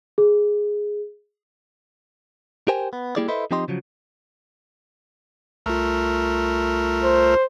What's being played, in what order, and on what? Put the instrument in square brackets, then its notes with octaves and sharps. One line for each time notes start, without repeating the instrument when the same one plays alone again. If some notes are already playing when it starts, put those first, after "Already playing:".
[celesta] G#4
[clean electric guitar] G4 A#4 C5 G5 G#5
B3
G3 A#3 E4 G#4 D5
E4 A4 B4 C5 D#5 E5
F3 C4 D#4 G4 D#5 C6
C#3 F3 F#3
[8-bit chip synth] C2 F4 [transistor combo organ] A3 A#4
[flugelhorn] C5